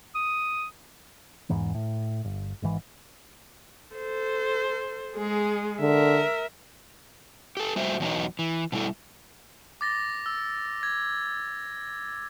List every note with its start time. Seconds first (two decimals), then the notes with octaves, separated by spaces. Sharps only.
0.15 D#6
1.50 E2 G#2 E3
1.75 A2
2.24 G1
2.62 G#1 G#2 E3
3.94 A4 C5
5.16 G#3 G#4
5.80 D3 A#4 E5
7.57 G4 A4
7.76 G3 A3 F#4 G4 C5 E5
8.00 E2 B2 F#3 B3 D#4
8.39 E3
8.72 B2 G3 E4 A4
9.81 D6 A6 A#6
10.26 E6
10.83 G#6